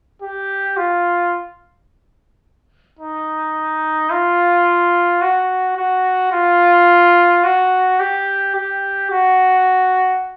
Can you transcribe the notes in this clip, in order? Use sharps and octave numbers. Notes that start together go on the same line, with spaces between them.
G4
F4
D#4
F4
F#4
F#4
F4
F#4
G4
G4
F#4